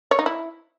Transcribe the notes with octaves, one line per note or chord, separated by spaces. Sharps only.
C#5
D#4
E4